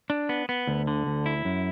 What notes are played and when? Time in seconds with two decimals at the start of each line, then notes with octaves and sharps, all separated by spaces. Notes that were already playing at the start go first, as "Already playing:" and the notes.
0.10 D4
0.29 B3
0.49 B3
0.67 D2
0.87 D3
1.07 D2
1.26 E4
1.45 F#2